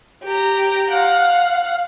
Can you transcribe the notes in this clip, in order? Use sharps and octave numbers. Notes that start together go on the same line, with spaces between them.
G4 A#5
F5 F#5